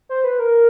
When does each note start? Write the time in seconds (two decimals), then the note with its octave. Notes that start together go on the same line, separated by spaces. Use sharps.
0.09 C5
0.24 B4
0.39 A#4